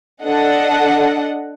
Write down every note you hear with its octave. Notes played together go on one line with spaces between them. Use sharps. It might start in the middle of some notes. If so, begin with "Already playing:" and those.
D4 A4 D#5 F#5